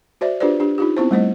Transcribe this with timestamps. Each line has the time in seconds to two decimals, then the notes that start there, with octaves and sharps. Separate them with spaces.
0.21 F#4 C5 D5 E5
0.40 D4 F4 G4 B4 C5 D5
0.60 D4 G4
0.78 D#4 F4 G4
0.97 B3 C4 E4 C5
1.11 G3 A3 C5 D#5